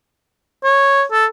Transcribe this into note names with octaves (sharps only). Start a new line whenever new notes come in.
C#5
A4